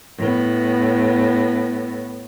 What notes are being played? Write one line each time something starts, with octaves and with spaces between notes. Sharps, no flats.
A2 B3